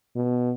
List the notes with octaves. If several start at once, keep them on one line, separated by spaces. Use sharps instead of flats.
B2